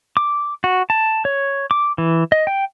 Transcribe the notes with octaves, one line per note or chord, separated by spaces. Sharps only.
D6
F#4
A5
C#5
D6
E3
D#5
G5